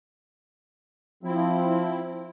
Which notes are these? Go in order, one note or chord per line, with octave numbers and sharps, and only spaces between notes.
F3 C4 E4